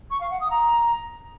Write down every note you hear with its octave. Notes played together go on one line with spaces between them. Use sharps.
C#6
F5
F#5
D#6
A#5